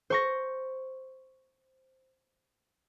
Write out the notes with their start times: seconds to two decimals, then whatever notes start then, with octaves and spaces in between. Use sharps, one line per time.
0.10 C5 C#6 A#6